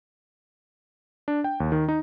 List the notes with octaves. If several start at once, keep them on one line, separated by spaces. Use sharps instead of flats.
D4
G5
D#2
D#3
D#4